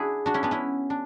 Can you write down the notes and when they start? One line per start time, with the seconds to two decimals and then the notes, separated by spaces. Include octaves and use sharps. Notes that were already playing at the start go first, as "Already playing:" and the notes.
Already playing: D4 E4 F#4 G#4
0.26 D4 F#4
0.34 C#4 E4
0.43 B3 D4
0.51 C#4 E4
0.90 D4